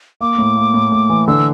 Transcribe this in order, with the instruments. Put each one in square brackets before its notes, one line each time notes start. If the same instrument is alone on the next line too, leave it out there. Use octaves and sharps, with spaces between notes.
[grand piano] A#3 [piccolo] D6
[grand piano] A2
A#3
A2
A2
E3
[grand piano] D3 [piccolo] E6